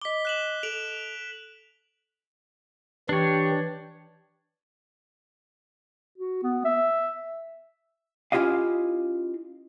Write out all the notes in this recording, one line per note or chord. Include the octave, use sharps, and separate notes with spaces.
D#5 D6 B6 G7
F#6 E7 F#7
A4 D7 F7 F#7
E3 D4 G4 C#5
F#4
B3
E5
C#4 E4 F4 G4 D#5 F5